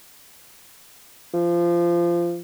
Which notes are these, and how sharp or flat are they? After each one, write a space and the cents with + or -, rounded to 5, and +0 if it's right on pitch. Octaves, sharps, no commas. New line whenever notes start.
F3 -20